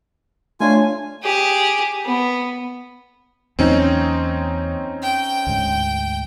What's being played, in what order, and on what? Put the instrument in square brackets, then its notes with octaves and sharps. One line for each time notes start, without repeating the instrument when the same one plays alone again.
[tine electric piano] A3 D4 C#5 [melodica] F4 G#5
[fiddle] G4 G#4
B3
[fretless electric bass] E2 F#3 A#3 [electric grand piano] C4 C#4 D#4
[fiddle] G5
[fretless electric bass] D2 G#2